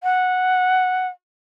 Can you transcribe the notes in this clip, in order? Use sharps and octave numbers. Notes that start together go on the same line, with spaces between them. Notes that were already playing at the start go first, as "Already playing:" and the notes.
F#5